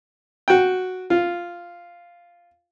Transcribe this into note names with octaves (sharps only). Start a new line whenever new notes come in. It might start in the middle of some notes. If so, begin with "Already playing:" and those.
F#4 G5
F4